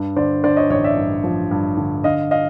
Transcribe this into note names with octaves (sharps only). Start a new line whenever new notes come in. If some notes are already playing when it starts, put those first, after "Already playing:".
Already playing: G2
D3 C5 D5
D3 C5 D5
C#5 D#5
A1 C#5 D#5
D5 E5
G2
F3
G2
D3
D3 D#5 F5
D#5 F5